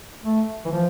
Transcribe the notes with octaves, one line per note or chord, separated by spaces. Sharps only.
A3
E3
F3